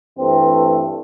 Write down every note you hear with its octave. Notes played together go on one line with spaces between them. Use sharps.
G2 E3 A3 C4